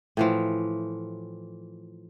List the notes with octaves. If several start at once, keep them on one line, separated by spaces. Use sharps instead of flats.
A2 E3 F3